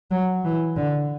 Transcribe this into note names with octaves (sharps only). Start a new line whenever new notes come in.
F#3
E3
D3